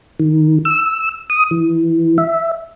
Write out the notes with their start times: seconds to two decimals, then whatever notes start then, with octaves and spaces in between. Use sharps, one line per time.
0.19 D#3
0.65 E6
1.30 D#6
1.51 E3
2.18 E5